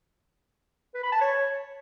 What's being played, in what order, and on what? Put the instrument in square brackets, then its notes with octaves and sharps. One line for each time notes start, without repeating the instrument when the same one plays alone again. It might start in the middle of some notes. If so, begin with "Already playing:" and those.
[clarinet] B4
B5
A5
C#5